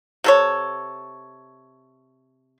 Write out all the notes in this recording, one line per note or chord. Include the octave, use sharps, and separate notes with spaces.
C3 A4 C#5